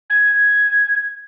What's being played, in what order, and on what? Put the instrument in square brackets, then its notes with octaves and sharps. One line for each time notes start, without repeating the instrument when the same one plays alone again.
[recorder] G#6